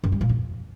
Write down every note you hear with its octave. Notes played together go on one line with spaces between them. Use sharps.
F#2
G3
A#2
F2